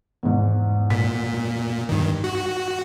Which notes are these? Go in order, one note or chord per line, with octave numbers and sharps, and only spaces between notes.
E2 G#2
A#2 B6
G2 D#3
F#4